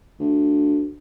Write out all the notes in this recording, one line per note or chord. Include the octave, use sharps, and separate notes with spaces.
D2